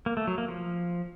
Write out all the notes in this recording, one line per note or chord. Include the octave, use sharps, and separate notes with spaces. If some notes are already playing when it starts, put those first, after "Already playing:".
A#3
A3
F#3
A#3
F3